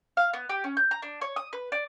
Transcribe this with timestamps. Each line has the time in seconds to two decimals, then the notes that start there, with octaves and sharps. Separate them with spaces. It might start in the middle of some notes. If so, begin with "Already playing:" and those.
0.17 F5
0.33 B3
0.49 G4
0.64 C#4
0.77 G6
0.91 A#5
1.02 D4
1.21 C#5
1.36 D#6
1.53 B4
1.72 D5